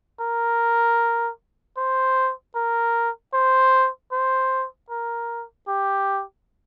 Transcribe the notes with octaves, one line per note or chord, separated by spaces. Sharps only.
A#4
C5
A#4
C5
C5
A#4
G4